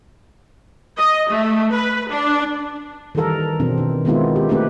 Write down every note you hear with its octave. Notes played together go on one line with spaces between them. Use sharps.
D#5
A3
B4
D4
D#3 E3 G3 A4 A#4
B2 E3 C4 D4
D#3
D#3 G#3 B3 C4 E4 F4
G4
A3 A#3 C4 D4 G4 B4